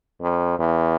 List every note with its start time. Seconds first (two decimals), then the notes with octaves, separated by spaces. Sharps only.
0.21 F2
0.59 E2